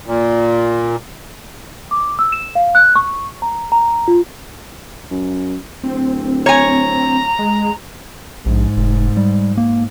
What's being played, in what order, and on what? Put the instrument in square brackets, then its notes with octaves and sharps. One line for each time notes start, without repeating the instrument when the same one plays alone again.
[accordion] A#2
[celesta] D6
E6
E7
F5
F#6
C#6
A#5
A#5
F4
[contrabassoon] F#2
[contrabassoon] D1 [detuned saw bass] C4
[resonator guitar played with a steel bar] C#5 G#5 [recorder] A#5
[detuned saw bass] G#3
[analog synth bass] A#1 [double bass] G#2
[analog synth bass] F1
G3
A#3